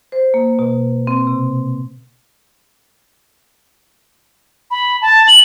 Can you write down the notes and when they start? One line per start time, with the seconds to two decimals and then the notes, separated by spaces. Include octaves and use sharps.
0.12 C5
0.34 A#3
0.59 B2
1.07 C4
1.27 C3
4.71 B5
5.02 A5
5.28 F#7